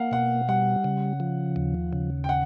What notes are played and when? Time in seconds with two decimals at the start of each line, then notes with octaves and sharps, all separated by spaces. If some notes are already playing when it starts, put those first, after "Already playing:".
Already playing: A#3 F5 F#5
0.11 B2 F#5
0.48 G3 F#5
0.84 C#3
1.20 F3
1.56 D#2
1.93 C#3
2.24 G5
2.29 F#5